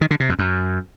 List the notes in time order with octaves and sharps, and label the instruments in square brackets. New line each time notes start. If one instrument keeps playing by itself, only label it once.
[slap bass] D#3
D3
C3
F2
F#2